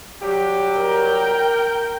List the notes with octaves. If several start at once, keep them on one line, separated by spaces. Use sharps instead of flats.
F#3 G3 G4
A#4 G5